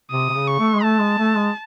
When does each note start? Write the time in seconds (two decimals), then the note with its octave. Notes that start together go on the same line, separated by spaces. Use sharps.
0.11 C3 D#6
0.29 C3
0.36 C#3
0.48 C#6
0.59 A3
0.74 G#3
0.83 A3 A5
1.00 G#3
1.18 A3
1.36 G#3